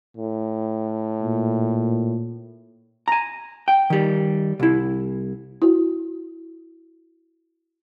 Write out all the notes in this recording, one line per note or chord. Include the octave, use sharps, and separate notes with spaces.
A2
A#2
G#5 A#5
G5
D#3 G3
C2 E4
E4 F#4